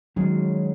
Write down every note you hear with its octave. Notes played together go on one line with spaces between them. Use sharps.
D#3 F#3 G#3 C#4 G#4